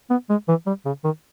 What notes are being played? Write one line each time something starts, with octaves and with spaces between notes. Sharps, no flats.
B3
G#3
E3
G3
C#3
D#3